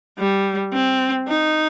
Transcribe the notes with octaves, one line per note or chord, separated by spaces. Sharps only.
G3
C4
D#4